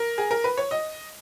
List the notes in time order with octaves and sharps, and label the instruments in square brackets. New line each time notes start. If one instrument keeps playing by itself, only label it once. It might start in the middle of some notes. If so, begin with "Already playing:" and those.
Already playing: [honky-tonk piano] A#4
G#4
A#4
B4
C#5
D#5